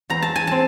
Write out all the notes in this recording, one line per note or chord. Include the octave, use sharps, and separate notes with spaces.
E2 A#5
A5
G#5
C4 A5